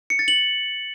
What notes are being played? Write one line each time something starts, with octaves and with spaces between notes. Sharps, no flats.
C#7
A6
F#7